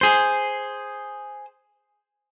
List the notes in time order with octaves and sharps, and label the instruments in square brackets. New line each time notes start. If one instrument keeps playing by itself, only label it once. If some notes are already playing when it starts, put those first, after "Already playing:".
[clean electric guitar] G#4 C5